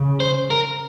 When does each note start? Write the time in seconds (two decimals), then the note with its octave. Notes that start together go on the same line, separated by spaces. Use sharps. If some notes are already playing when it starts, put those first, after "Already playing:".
Already playing: C#3
0.20 C5
0.50 A#4